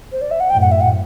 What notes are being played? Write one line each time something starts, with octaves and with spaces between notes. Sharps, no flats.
C5
D5
E5
F#5
F#2 A2 G5
F#5
E5
F#5